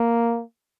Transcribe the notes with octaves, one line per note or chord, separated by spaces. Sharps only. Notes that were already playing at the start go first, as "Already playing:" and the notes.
Already playing: A#3